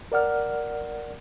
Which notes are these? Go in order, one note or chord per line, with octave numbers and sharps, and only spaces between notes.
A#4 D5 F#5 F6